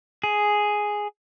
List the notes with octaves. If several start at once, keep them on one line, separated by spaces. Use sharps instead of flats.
G#4